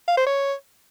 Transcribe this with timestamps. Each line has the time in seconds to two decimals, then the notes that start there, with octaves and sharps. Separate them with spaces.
0.08 F5
0.17 C5
0.26 C#5